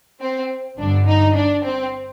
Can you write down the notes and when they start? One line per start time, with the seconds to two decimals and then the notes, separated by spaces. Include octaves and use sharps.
0.21 C4
0.78 G1 G2 D3 D4
1.07 D#4
1.35 D4
1.64 C4